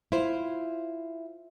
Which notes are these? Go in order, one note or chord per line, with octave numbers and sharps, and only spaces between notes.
E4 F4 C5